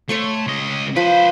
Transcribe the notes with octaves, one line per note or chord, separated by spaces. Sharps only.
A3 C#5 C6 C#6
C#2 D#5
F3 B4 C5